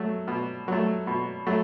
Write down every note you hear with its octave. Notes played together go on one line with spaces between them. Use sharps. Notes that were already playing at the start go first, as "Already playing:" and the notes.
Already playing: F#3 A3
B2
F#3 A3
B2
F#3 A3